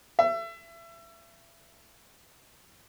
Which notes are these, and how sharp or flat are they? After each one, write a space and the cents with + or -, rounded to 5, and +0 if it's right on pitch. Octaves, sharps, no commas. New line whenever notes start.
E5 +30